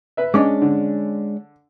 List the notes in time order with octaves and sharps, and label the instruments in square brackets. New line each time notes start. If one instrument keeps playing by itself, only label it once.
[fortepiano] B4 E5
[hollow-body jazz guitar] G#3 C#4 D4 [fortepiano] D#5 D6
[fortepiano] D3